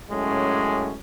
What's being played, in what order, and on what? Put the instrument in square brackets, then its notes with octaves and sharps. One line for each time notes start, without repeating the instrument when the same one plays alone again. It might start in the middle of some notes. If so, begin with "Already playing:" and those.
[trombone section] F#2 A2 G#3 C#4